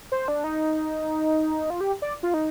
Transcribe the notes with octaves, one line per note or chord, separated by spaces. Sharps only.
C5
D4
D#4
F4
G4
D5
F4
D#4